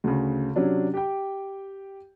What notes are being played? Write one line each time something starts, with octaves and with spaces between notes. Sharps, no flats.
D2 C#3
C3 F#3 C#4 D4
G4 G5